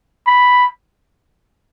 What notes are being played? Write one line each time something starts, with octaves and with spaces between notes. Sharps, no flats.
B5